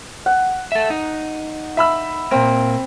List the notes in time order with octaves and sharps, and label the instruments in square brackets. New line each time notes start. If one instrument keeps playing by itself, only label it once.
[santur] F#5
[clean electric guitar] A4 E5
D#4
[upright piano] E5 B5 E6
[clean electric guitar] A#2 A#3 [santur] C4